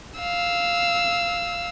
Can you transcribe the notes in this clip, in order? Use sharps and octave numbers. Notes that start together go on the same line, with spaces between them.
F5 E6